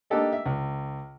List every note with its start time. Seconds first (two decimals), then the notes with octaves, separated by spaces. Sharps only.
0.10 A#3 D4 D#4 G4 A4 D#5
0.33 E5
0.46 C#2